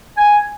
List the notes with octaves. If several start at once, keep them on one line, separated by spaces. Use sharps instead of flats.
G#5